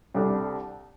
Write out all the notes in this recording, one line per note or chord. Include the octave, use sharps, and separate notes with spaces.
C2 C3 G3 D4 A4